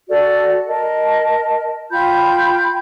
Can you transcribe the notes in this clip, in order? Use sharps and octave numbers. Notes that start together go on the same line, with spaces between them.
F#4 A4 D5
A#4 D#5 A5
F4 G5 B5 G6